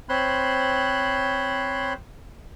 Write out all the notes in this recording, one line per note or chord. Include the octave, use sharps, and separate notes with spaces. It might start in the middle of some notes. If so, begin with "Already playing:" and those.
C4 C5 C#5 B5 C6 F#6